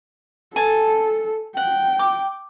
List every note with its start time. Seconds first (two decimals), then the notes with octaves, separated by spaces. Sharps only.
0.56 A4 G#5 A5
1.57 F#5 G5
1.99 D6